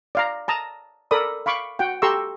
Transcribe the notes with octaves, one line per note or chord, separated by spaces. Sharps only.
D5 F5 A#5
A5 A#5 D#6
A4 A#4 D5 B5 D#6
F5 B5 C#6 D6
F#4 F#5 G5
G4 A4 A#5 C6 C#6 E6